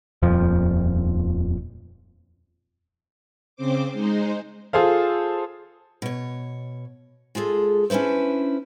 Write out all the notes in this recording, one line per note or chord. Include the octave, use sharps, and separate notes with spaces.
D#1 F2 F3
C#3 C4 C5 D6
G#3 D#4 C5
F4 G#4 A4 C5 F5
B2 C#5
G#3 F4 G#4 A4
C#4 D4 E4 B4 C5